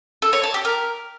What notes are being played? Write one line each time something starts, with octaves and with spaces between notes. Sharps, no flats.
A4
C#5
A5
G4
A#4